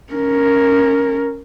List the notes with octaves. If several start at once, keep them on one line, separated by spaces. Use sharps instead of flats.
C#4 A#4